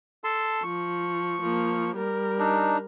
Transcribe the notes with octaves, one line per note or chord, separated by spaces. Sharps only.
A4 A5 C6
F3 C#6
F3 A#3
G3 A#4
D4 D#4